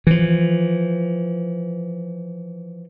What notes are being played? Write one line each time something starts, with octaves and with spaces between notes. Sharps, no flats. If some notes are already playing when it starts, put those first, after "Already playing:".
E3 F3